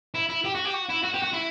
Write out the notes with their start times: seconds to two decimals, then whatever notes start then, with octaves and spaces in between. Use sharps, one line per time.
0.14 E4
0.29 E4
0.45 G4
0.55 F#4
0.65 G4
0.74 F#4
0.90 E4
1.04 F#4
1.14 G4
1.23 F#4
1.33 E4